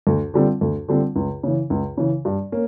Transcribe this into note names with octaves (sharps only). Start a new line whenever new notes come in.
D2
D3 G3 C4 F4
D2
D3 G3 C4 F4
C#2
C#3 E3
C#2
C#3 E3
G2
A#3 C#4